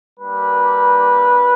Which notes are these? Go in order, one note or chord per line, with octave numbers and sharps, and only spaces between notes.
G3 A#3 D4 B4